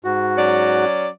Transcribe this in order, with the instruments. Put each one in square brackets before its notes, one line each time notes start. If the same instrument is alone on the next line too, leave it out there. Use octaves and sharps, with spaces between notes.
[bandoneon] G#2 F#4
[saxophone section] F#3 C#4 D5